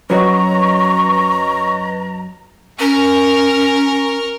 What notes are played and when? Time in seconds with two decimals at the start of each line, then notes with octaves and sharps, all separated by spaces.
0.10 F#2 F#3 F#4 B4 C#5 D#5 A#5 C#6
2.79 C#4 A#4 C#6 F6